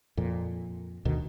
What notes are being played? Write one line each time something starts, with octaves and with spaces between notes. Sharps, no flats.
F2 A#2
D2 B2 D#3